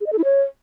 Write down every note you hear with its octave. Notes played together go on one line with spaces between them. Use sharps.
G#4
D#5
A4
E4
C#5